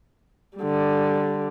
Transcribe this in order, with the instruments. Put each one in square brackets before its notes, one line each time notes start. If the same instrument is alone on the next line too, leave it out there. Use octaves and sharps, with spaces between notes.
[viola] D3 G3